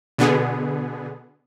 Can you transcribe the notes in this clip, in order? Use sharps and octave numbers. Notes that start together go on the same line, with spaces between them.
B2 D3 B3 G#4